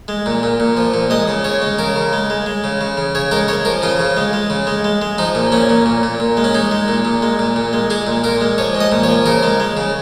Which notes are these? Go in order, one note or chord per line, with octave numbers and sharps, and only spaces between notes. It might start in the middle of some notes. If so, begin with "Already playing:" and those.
G#3
A#2
A#2
A#2
F3
A#2
G#3 D#5
C#3
C#3 C#5
G#3
C#3 A#4
C#3
G#3
G#3
G#3
C#3
C#3
C#3
C#3 C#5
G#3 A#4
G#3 C#5
F3 A#4
C#3 F4
C#3
G#3
G#3
C#3
G#3
G#3
G#3
F3 D#4
A#2
A#2 C#4
A#2
A#2
A#2
A#2
G#3
C#4
G#3 D#4
G#3
A#2
A#2
G#3
A#2
A#2
G#3
G#3 G#4
A#2
A#2 A#4
G#3
F3 C#5
G#3
D#5
A#2
C#5
F3
C#3 A#4
G#3
G#3
C#3